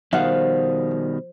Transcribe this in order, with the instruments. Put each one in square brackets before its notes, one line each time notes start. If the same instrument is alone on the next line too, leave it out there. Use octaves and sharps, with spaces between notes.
[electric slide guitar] B2 D#3 G3 [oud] F3 [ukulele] F5 F#5